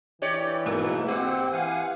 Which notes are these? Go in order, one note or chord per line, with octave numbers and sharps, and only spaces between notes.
E3 G4 C#5 D5
G#2 B2 G#3 A#3
C4 G4 F#5 E6
E3 F5 F#5 G#5